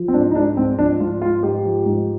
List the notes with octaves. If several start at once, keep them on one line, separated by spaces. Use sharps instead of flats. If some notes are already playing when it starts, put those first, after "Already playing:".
Already playing: F3
C4
G#2 D4
D#4
G#3 D4
G#2 C4
F3 D4
G#2 F4
G#3 F4
G#2 G4
F3
G#2